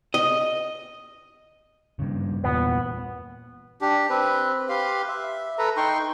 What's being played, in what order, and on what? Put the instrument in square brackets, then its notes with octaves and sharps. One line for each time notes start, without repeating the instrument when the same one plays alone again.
[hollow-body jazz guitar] D#5
[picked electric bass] G2 C#3
[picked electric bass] E2 A#2 [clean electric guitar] B3
[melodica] D4 G4
C4 B4
G4 B4 F5 C6
E5
A4 B4 A#5
D#4 G5 C6 C#6